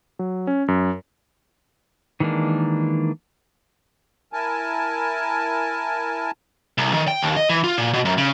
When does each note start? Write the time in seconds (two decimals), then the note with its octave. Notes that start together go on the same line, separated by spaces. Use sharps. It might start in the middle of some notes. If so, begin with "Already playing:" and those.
0.19 F#3
0.47 C#4
0.68 F#2
2.20 D#3 E3 G#3 A#3 D4
4.33 E4 A#4 G#5 A5
6.78 C2
6.93 D#3
7.08 G5
7.22 D#2
7.37 D#5
7.50 E3
7.64 F4
7.78 A#2
7.94 B2
8.05 F#2
8.18 C#3